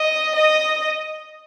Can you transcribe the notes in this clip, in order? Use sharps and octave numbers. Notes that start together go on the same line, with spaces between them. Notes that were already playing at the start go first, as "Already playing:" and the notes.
Already playing: D#5
D#5